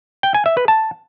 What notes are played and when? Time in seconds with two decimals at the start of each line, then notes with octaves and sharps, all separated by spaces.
0.23 G5
0.34 G#5
0.46 E5
0.57 B4
0.68 A5